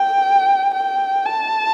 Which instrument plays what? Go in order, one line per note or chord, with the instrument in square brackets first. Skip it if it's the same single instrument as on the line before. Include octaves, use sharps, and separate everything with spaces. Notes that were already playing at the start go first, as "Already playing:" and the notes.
Already playing: [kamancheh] G5
G5
A5